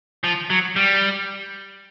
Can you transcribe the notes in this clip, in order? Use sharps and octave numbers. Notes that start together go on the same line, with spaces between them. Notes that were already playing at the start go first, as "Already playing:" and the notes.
F3
F#3
G3